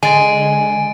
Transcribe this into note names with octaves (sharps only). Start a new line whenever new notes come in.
D3 G#3 G#5 A6 D7 D#7